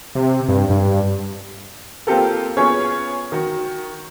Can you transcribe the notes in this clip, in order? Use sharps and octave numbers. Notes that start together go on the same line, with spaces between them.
C3
G2
G2
A#3 C4 F4 G4 A4 A#4
B3 C#4 F4 G#4 C#5
D#3 F#4